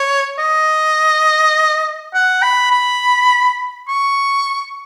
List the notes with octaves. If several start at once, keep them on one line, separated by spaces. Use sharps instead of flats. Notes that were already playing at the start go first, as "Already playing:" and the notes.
Already playing: C#5
D#5
F#5
B5
B5
C#6